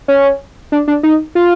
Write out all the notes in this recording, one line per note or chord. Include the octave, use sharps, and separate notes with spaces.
C#4
D4
D4
D#4
F4